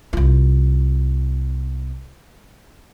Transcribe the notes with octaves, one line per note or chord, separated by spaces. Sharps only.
C2 F4